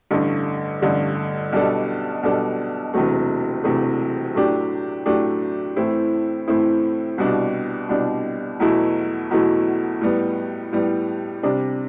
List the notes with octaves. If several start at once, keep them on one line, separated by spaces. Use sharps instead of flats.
A1 G2 D3 A3
A1 G2 D3 A3
B1 B2 G3 D4 A4
B1 B2 G3 D4 A4
E1 E2 C3 F#3 A3
E1 E2 C3 F#3 A3
A2 F#3 A3 D4 G4
A2 F#3 A3 D4 G4
A2 E3 A3 C4 E4
A2 E3 A3 C4 E4
C2 B2 G3 D4
C2 B2 G3 D4
E2 B2 F#3 A3 E4
E2 B2 F#3 A3 E4
A2 G3 B3
A2 G3 B3
C3 G3 D4